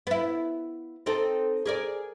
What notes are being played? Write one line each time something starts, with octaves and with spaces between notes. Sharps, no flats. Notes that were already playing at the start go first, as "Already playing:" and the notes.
B3 E4
C4 D#4 A4
G#4 A#4 D5